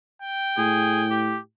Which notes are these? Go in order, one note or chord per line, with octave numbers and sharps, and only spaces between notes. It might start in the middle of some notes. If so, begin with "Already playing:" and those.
G5
A2 G#4
G4